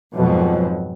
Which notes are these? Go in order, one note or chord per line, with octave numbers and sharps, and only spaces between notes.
F2 G#2 B2 F#3